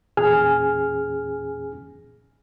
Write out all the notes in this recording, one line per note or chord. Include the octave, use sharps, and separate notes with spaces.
E2 A#2 C#4 G#4 G#5 F6